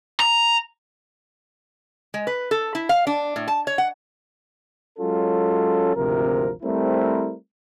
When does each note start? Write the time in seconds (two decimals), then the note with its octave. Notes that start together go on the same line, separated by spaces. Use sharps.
0.20 A#5
2.14 G#3
2.27 B4
2.51 A4
2.75 E4
2.89 F5
3.07 D4
3.36 A2
3.48 A5
3.67 C#5
3.78 F#5
4.99 F#3 G#3 C#4 F4 A4
5.95 G#1 D2 C3 F3 A#4
6.62 G3 A3 C4 E4 A#4 C5